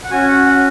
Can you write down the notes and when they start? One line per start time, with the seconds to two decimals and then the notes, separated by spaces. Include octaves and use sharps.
0.04 F#5
0.11 C#4 F#4 G#5
0.28 F#5
0.46 F#5